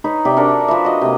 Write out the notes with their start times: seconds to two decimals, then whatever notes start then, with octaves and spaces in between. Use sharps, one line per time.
0.04 D#4 B4 C#5
0.25 C3 D5 E5 G5
0.37 D4 F#4 A4 A#4
0.68 F3 B4 E5
0.85 F#4 D#5
1.01 C3 A#3